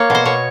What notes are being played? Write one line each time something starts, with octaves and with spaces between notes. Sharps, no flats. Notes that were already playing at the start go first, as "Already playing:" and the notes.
Already playing: A#3 C#5
B2 C5
B2 C#5